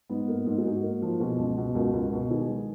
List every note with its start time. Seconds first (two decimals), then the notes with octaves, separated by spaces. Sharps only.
0.09 G#2 B3
0.28 A#3
0.46 G#2
0.58 G#4
0.64 G#2 D#4 F#4
0.83 A#3
1.02 F3
1.20 B2 F4 G#4
1.38 C#2
1.58 B2
1.75 C#2 F#4 A#4
1.93 C#2
2.12 B2
2.30 D#3 G#4 B4
2.49 G#3